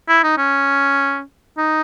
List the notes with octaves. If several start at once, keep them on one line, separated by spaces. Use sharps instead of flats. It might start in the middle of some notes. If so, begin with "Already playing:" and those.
E4
D#4
C#4
D#4